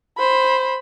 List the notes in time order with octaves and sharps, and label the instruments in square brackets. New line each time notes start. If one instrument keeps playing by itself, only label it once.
[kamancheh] C5 B5